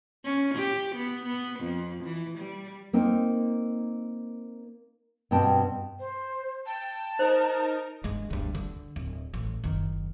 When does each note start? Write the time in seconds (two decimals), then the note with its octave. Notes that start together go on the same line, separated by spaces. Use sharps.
0.24 C#4
0.55 G4
0.96 B3
1.26 B3
1.60 F2
2.04 E3
2.39 G3
2.93 A#3 C4 D#4 A#4
5.31 G2 B2 C4 G5 A5
5.99 C5
6.66 G5 A5
7.19 D#4 A#4 C5
8.04 G2 G#3
8.31 D2 G2
8.55 D3
8.96 D1
9.34 A1
9.64 F#1 D#3